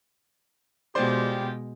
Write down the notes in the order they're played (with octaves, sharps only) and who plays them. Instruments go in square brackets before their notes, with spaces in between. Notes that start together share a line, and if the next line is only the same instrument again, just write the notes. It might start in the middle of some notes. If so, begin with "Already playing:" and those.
[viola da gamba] B2 G#3 [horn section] G3 F4 G4 [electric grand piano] C5 D5 C6